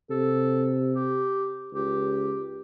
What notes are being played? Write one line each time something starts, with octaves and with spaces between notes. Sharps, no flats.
C3 A4
G4
C#2 G4